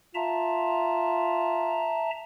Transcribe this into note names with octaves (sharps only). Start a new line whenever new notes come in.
F4 E5 A5 A#5